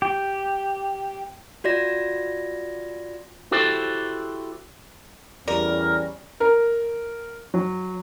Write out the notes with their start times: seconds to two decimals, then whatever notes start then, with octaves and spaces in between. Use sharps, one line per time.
0.02 G4
1.64 F4 F#4 D5 A#6
3.51 E4 F#4 G4 A4 C5
5.48 E2 G3 C#4 A#4 D5
6.40 A#4
7.54 F#3